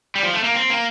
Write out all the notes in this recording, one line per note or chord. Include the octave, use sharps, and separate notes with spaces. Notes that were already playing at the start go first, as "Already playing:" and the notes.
G3
F3
A3
A#3
C4
A#3